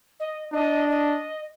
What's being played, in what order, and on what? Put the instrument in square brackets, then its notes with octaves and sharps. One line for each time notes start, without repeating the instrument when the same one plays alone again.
[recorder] D#5
[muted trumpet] D4 [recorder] D#5
[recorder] D#5